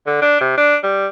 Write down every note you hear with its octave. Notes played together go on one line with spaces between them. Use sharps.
D3
D4
C3
D4
G3